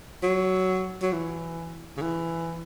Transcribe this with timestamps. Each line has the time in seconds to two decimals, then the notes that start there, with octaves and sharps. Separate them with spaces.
0.23 F#3
1.02 F#3
1.12 E3
1.97 C#3
2.02 E3